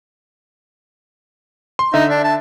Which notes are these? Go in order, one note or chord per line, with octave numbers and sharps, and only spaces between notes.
C6
D3 D#4 E5
D4
A5